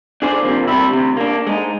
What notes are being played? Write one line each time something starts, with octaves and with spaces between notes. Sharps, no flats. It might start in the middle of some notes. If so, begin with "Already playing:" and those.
D4 G#4 C5 D5
C3 D#3 F3 A#3
C3 G3 E4
D2 C3
A#3 D4
G#3 D#4